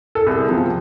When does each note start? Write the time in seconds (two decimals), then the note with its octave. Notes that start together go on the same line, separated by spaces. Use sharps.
0.15 A4
0.27 C2 G#4
0.48 C3 F3